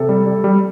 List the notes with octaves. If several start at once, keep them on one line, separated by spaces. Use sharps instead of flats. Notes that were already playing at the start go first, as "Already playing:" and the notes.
Already playing: C3 A4
G3
G3
G3